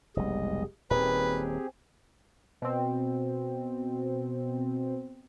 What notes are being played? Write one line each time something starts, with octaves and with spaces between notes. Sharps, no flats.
F1 B1 G3 G#3 D#5
D#1 A#2 D#3 C4 G4 G#4 B4
B2 C4